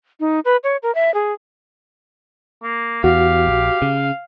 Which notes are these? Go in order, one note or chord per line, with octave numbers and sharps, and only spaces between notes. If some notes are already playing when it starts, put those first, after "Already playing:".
D#4
B4
C#5
A#4
E5
G#4
A#3
E2 F#4 G4 F5
A#1
C#3